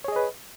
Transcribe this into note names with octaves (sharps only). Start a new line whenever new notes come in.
G#4 B4 C#5 D#5